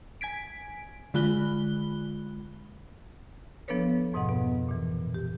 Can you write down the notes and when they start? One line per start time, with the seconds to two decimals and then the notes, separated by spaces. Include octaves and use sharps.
0.21 G#5 G#6 B6 D7
1.14 D3 G#3 F4 B5 F#6 G7
3.68 F3 B3 D4 A4 B4 C#5
4.13 F2 G#2 B2 F3 D#5 F#5
4.29 B3 B4
4.68 A#2 E3
5.14 G4